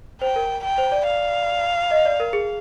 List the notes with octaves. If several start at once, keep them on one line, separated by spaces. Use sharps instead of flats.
C5 G5
A#4
G5
C5
D5
F5
D#5
D5
A#4
G#4